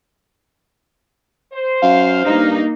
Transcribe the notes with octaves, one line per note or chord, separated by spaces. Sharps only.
C5
F#2 F5
G2 A#3 D#4